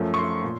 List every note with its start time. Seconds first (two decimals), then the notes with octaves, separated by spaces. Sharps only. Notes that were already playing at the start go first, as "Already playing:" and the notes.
Already playing: F#2 F3 A3
0.14 C#6
0.18 C6
0.44 A#2